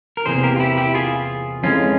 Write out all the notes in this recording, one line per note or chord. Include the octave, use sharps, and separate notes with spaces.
A#4
E2 C3 E3 A#3 G#4 C5
G4 A#4
F4
E4 G4
E4 G4
F4 G#4
F2 E3 G#3 C#4 F4